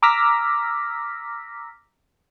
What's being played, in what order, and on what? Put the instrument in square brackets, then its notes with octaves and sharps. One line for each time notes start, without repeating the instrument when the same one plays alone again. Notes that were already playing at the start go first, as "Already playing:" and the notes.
[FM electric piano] A#5 D6 E6 F6 A#6 B6